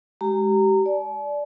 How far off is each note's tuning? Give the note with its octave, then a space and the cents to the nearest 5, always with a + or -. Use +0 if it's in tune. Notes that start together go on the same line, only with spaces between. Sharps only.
G#3 +0 G4 -30 A#5 -20
D5 -10 A5 -45